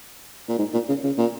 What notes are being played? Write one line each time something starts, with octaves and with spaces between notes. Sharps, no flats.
A#2
G#2
A#2
C#3
C#3
A#2